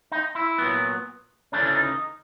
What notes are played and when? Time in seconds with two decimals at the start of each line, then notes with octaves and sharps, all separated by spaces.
0.12 D#4
0.35 E4
0.58 A#2 F#3 B3
1.52 D2 C#3 E3 A3 C#4 D4
1.66 D4
1.75 D#4